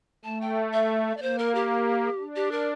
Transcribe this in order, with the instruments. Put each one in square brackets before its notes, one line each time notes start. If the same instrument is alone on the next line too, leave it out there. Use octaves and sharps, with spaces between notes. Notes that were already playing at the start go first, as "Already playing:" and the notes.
[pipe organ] A3 [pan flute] A5
[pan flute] G5
E5
D5
[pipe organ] A#3 [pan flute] C5
[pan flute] A#4
G4
[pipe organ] D4
[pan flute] G4
A#4